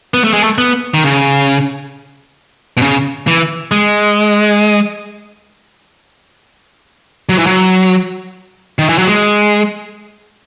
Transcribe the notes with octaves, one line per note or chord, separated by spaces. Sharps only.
B3
A3
G#3
A3
B3
D#3
C#3
B2
C#3
E3
G#3
F#3
E3
F#3
D#3
E3
F#3
G#3